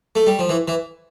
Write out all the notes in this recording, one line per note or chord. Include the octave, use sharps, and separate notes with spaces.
A3
G3
F3
E3
E3